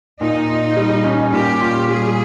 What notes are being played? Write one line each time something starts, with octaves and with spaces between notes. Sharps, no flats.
A#2 D#4
F4
G3
C#4
A#2 G4
F4
G3 G#4